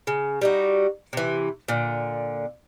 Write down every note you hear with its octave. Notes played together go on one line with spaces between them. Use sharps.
C#3
G3 D#4 F#4
C3 E3
A#2 D3